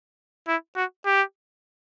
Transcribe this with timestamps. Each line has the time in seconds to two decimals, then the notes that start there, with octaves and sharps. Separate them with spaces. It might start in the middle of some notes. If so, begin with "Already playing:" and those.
0.48 E4
0.76 F#4
1.05 G4